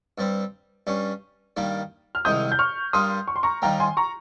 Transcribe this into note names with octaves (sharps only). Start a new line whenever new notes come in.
G2 G3 C4
G2 G3 C#4
G2 D#3 G3 A#3
F6
C2 C3 D#3 G#3 D#6 G6
G6
C#6 F6
G2 G3 A#3 C6 D#6
C#6
C6
A#5 C#6
D#2 D#3 G3 A#3 G5 A#5
G#5 C6
A#5 C#6